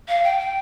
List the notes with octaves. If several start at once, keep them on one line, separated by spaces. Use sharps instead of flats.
F5
G5
G5